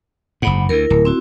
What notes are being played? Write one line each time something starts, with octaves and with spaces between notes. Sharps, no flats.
F#1 G#2 F#5 B5
D2 E4 A#4
D1
C4 E4 F#4